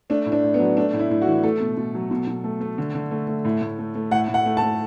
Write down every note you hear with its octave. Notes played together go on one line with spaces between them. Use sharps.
A3 D4
A2
D4
A2
B3
F#3
A3 D4
A2
E4
A2
F#4
E3
A3 A4
B2
B2
F#3
B2
B2
A3
A3
D3
D3
A3
A3
A2
A2
A3
A3
A2 F#5
A2
F#5
A3
A5
A3